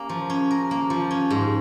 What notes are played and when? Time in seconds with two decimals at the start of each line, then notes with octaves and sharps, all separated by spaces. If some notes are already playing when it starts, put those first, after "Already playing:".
Already playing: A#3 C#4 A#4
0.09 F3
0.30 C#4
0.51 A#4
0.71 A#3
0.90 F3
1.11 C#4
1.30 G#2